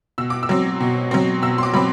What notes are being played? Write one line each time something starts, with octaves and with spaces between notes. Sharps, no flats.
B2 E6
D6
E6
F#3 C4
B2
F#3 C4
B2 E6
C6
D6
F#3 C4 B5